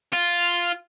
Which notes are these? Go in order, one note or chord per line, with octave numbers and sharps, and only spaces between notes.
F4